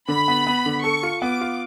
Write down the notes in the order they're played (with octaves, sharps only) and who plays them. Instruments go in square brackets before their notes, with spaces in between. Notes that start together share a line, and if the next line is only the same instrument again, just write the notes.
[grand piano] D3 [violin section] B5
[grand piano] B3
B3
D3
[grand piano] A4 [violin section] C#6
[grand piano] F4
[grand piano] B3 [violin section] D6
[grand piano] F4